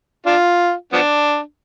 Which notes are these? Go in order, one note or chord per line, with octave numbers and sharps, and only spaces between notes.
D4 F4
F3 B3 D4